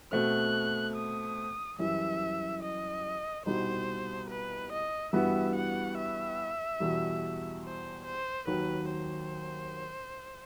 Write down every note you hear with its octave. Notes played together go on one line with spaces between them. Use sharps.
B2 A3 C4 F#6
D#6
F#2 E3 G3 E5
D#5
C2 B2 G3 D#4 C5
B4
D#5
G2 E3 G3 B3 F#4 E5
F#5
E5
E2 B2 G3
C5
C5
D#2 D#3 F#3 B4
C5